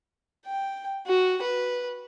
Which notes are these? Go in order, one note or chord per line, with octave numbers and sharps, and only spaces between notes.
G5
F#4
B4